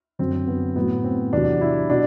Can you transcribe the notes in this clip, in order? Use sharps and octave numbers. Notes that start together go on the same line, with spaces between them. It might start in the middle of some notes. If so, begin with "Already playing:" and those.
F#2 D3 F#3 C4
B3
A2 F#3 B3
C4
E2 C3 F#3 D4
E4
B2 D4